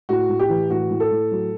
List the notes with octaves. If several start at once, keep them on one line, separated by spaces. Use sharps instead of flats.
A2 F#4
A2
G4
E3
A2 F#4
A2
A4
A2
F#3